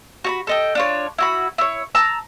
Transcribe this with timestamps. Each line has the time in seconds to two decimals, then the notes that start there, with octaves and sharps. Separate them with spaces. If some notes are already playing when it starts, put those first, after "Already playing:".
0.24 F#4 A#5 B5
0.47 A4 D#5 G5
0.75 D4 F4 C#5
1.18 E4 F#4 B5
1.58 E4 C#5
1.95 A5 A#5 E6